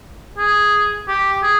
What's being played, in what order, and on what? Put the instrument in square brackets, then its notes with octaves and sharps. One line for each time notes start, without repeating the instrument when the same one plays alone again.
[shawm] G#4
G4
G#4